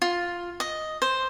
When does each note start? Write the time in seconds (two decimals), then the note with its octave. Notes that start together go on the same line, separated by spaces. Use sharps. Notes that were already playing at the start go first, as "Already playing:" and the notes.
0.02 F4
0.60 D#5
1.02 C5